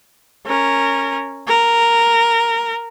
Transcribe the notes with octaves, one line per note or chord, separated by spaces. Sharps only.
C#4 A#4
A#4